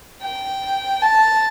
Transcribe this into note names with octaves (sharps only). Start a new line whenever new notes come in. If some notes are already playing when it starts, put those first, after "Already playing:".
G5
A5